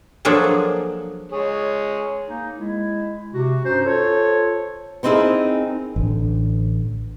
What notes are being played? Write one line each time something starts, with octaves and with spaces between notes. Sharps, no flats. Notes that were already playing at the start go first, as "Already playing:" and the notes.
F3 F#3 A#3 D4 G#4 A4
G#3 G#4 C#5
A#3 D#4
G#3 E4
C3 F#4
G2 C#4 D#4 C5
F4 A4 C5 C#5
B3 C4 D#4 E4 G#4 A#4
A1 D3